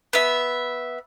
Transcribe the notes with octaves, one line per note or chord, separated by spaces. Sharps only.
B3 E5